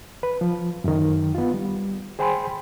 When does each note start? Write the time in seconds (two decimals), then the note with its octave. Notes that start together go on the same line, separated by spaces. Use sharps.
0.23 B4
0.41 F3
0.84 F#2 D#3
1.35 B3 F4
1.54 G3
2.19 G#4 C5 G5 G#5 B5 C6